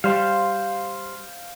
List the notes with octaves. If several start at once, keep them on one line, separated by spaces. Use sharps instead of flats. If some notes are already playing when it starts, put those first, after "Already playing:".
G3 C5 F5